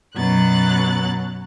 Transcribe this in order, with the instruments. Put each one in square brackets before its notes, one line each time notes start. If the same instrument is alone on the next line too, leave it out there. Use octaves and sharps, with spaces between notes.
[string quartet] F#2 B2 F#3 F#6 A6